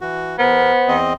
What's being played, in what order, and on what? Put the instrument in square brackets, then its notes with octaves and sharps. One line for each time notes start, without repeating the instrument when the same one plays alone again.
[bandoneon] E3 F#4
[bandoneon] E2 A#4 [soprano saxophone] B3 [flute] C5
[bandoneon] E2 C4 D#5